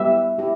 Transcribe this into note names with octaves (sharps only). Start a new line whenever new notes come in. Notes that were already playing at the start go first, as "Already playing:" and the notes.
Already playing: G3 B3 E4 G4 E5
E4 G4